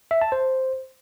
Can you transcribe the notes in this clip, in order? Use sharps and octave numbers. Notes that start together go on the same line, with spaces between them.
E5
A5
C5